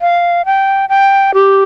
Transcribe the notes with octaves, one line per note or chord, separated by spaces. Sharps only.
F5
G5
G5
G4